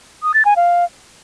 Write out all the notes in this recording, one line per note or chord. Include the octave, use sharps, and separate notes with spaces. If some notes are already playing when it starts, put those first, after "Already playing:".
D#6
A6
G#5
F5